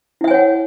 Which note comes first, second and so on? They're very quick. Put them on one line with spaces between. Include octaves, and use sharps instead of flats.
E4 E5 G#5 C#5 F#5